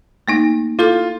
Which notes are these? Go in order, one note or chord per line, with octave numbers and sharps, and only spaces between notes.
A3 A#3 D#4
E4 F4 A4 F6